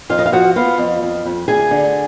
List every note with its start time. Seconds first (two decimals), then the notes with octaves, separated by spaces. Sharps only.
0.09 F2 F4 F5
0.19 D#5
0.26 F5
0.32 F3 F#4 F#5
0.56 B3 F4 F5
0.78 F2
1.02 F2
1.25 F2
1.48 D2 G#4 G#5
1.71 D3